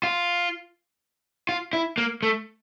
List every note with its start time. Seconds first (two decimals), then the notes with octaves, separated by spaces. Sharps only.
0.03 F4
1.49 F4
1.73 E4
1.98 A#3
2.23 A3